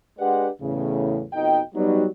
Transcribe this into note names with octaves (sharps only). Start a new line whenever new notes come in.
G#3 D4 G4 B4 D5 F#5
E2 A2 C#3
F2 B2 D#4 D#5 G5
F#3 G3 B3 D#4